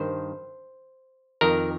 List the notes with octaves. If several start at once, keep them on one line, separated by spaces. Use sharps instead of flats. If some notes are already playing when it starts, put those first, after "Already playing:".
Already playing: G2 D#3 C5
F2 D#3 A#4